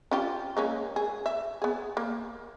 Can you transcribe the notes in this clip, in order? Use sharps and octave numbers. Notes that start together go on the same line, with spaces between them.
C#4 F4 G4
G#3 A#3 C#4
G#4
E5
B3 G#4
A#3